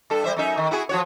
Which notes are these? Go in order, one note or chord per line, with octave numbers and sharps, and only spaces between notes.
G2 A4
G3 C5 E5
F#2 D#4 E5
D#3
E4 F#4 G#4
F3 F#4 C#5